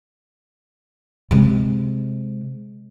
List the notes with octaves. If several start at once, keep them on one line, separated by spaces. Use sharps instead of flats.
C3 G#3